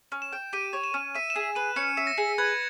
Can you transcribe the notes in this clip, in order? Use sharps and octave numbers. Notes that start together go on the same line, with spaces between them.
C#4
E7
G5
G4 D#7
C#5
E7
C#4
E5 D#7
E7
G#4 D#7
B4 D#7
C#4 C#7
E5
A#6
G#4
B4 G#6